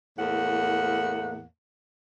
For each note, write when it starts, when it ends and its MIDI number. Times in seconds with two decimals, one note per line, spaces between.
0.18 1.43 40
0.18 1.43 45
0.18 1.43 58
0.18 1.43 78